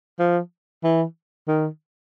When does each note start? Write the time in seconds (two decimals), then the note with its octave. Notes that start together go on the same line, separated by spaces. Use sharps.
0.19 F3
0.84 E3
1.48 D#3